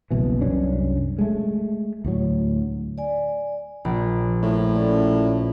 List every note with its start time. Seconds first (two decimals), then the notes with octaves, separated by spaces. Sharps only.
0.11 F#1 C2 B2 E3
0.41 C2 F#2 C#4 D4
1.18 G#3 A3
2.05 D2 A2 F#3
2.98 D5 G#5
3.85 A#1 B5
4.43 A2
4.75 C#4 A4 D5